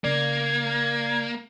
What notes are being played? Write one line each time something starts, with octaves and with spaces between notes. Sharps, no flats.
C#3 A#3 D5 G#6